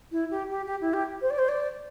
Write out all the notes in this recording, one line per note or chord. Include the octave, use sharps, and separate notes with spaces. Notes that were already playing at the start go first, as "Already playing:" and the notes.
E4
G4
G4
G4
E4
G4
C5
D5
C5
D5